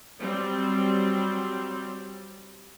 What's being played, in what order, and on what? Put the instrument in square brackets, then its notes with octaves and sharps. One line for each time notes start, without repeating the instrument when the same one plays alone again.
[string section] F#3 G3 C4